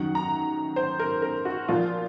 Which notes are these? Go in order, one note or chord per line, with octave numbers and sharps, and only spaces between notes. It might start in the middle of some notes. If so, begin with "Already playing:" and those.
Already playing: F#2 D#3 F#3 F#5
A#5
C5
A#4
A#4
F#4
A#2 F3 A#3 F4